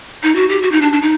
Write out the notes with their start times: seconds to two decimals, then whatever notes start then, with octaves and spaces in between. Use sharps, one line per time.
0.23 D#4
0.36 F#4
0.49 G4
0.62 F#4
0.72 D#4
0.82 D4
0.93 D4
1.02 D#4